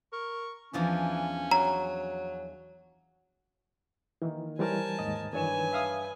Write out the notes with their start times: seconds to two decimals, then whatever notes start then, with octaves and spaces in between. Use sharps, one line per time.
0.13 A#4 C#6
0.73 E2 E3 F3 C#4 D4
1.51 F#3 A#5
4.22 D#3 E3 A#3
4.59 E3 G3 A#4 C5 C#5 G#5 A5
4.99 D#2 G#2 D#5
5.33 G2 D#3 E3 B4 C#5 G#5 E7
5.73 E5 F5 D#6